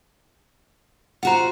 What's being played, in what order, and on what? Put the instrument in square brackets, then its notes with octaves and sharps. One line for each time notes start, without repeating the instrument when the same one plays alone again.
[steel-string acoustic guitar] F4 F#4 C5 [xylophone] F#5 A#5